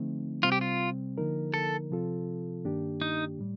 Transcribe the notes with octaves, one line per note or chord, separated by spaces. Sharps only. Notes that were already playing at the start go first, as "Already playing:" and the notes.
Already playing: D3 F3 A3 C4 D#4
C3 G3 C4 F4
G4
F4
D3 F3 A#3 D#4 A#4
A4
C3 F3 C4 F4 A4
G2 D#3 A#3 D4 G4
D#4
A2 G3